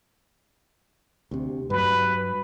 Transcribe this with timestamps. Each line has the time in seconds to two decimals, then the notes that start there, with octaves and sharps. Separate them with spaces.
1.31 D2 C3
1.70 G2 F#3 B4